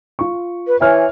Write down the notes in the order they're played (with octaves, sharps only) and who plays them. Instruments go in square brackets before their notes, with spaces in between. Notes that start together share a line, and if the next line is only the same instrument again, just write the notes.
[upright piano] F4 C#6
[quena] B4
[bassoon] E3 [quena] C#5 [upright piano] G#5 F6